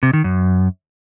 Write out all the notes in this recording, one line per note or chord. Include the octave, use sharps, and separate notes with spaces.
C3
D#3
F#2